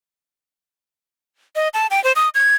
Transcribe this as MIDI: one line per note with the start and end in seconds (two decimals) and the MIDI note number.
1.56 1.68 75
1.74 1.87 81
1.91 2.02 79
2.04 2.12 72
2.16 2.29 87
2.35 2.55 92